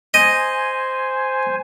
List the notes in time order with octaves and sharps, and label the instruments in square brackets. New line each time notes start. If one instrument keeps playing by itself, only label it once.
[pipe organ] C5 G#5 [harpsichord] D#5